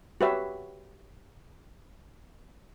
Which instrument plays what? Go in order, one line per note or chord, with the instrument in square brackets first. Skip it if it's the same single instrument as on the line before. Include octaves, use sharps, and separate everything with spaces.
[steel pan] F#4 G4 B4 C#5 E5